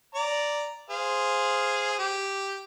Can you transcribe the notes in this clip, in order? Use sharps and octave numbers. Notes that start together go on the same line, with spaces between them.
D5 A#5
G#4 C5 F5
G4